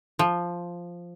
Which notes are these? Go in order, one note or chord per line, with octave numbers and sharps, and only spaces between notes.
F3